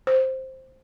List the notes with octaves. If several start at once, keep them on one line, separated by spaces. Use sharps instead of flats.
C5